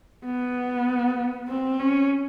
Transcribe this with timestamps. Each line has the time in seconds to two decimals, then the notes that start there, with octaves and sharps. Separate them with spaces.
0.25 B3
1.48 C4
1.80 C#4